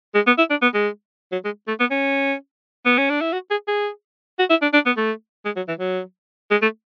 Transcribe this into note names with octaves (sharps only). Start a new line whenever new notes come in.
G#3
B3
E4
D4
B3
G#3
F#3
G#3
A3
B3
C#4
B3
C#4
D4
E4
F#4
G#4
G#4
F#4
E4
D4
D4
B3
A3
G#3
F#3
E3
F#3
G#3
A3